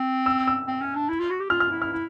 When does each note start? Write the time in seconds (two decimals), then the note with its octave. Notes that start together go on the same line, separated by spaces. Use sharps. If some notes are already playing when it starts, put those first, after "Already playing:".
Already playing: C4
0.26 E6
0.47 E6
0.67 C4
0.82 C#4
0.95 D4
1.09 E4
1.19 F4
1.30 F#4
1.40 G4
1.50 F4 F6
1.60 F6
1.71 E4
1.82 F6
1.92 E4